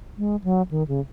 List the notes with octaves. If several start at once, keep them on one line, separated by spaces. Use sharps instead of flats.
G#3
F#3
D#3
C#3